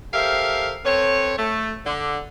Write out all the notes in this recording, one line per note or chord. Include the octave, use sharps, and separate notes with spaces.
G4 A4 A#4 C5 E5 F5
C4 A4 B4 C#5
A3
D3